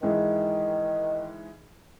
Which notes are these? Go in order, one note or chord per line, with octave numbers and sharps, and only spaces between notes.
G#2 D#3 E3 G#3